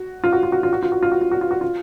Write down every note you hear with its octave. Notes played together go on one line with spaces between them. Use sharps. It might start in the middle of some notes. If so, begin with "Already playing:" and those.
Already playing: F#4
F4
F#4
F4
F#4
F4
F#4
F4
F#4
F4
F#4
F4
F#4
F4
F#4
F4